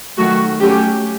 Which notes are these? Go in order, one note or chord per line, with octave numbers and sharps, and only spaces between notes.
D#3 F#3 A3 F#4
F#3 A3 C#4 G4